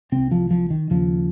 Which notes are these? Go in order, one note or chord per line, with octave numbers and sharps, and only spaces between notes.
C2 C3 C4
F3
F3
D#3
D#2 C#3 F3